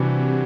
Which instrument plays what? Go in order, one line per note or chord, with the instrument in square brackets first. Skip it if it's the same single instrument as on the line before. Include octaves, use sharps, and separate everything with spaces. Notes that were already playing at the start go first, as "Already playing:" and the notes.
Already playing: [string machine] C3 [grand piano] E3 G3 D4 F#4